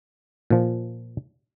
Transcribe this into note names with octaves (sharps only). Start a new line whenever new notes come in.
A#2 F3